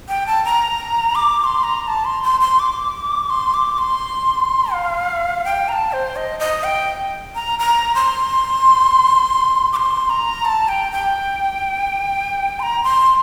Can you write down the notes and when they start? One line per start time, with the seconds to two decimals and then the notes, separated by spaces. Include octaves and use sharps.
0.08 G5
0.27 A5
0.45 A#5
1.15 D6
1.39 D6
1.44 C6
1.63 A#5
1.87 A5
2.05 C6
2.23 C6
2.40 C6
2.59 D6
3.30 C6
3.54 D6
3.78 C6
4.73 F5
5.45 G5
5.68 A#5
5.73 A5
5.92 C5
6.16 D#5
6.40 D#5
6.63 G5
7.35 A#5
7.59 A#5
7.95 C6
9.73 D6
9.76 C6
10.10 A#5
10.45 A5
10.68 G5
10.92 G5
12.59 C6
12.63 A#5
12.83 C6